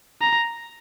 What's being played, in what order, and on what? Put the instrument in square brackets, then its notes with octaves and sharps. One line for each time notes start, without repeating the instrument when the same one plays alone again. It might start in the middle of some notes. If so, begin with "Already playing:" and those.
[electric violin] A#5